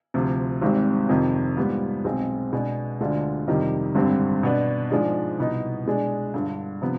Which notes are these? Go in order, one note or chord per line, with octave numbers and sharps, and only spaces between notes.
D2 C3 F3
G#1 G#2 G3 C4
F2 C3 D#3
G#2 G3 B3 F4
B1 B2 G#3 C4
B2 G#3 B3 D4
D2 D3 G#3 D4 F4
F2 C3 D#3 G3
G#1 G2 D3 G3 C4
B2 B3 D4
G#2 F3 G#3 D4
C2 B2 B3 D#4
B2 G#3 D4 G#4
G1 G2 D3
C3 F3 B3